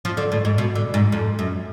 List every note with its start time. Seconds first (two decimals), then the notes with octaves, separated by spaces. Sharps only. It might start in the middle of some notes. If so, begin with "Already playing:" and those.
0.05 F3
0.17 D3
0.32 A2
0.45 G#2
0.58 B2
0.75 D3
0.94 G#2
1.12 F2
1.39 F#2